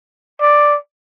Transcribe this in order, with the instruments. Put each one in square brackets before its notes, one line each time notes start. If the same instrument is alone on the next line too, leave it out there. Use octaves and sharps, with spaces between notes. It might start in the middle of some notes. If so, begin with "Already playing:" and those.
[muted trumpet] D5